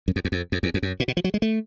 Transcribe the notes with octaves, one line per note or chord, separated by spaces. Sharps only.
F#2
F2
E2
F2
F2
E2
F2
F#2
A#2
B2
F3
F#3
G#3
A3